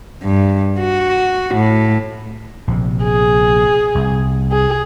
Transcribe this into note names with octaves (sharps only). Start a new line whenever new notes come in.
G2
F#4
A2
A#1 C3
G#4
C2
G#4